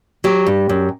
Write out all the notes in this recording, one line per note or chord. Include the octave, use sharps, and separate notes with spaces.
F#3 G4
G2
F#2